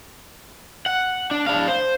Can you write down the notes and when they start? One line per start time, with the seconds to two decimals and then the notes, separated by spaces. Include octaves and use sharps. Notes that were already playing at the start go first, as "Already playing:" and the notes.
0.86 F#5
1.31 D4
1.47 D4 F5
1.68 C5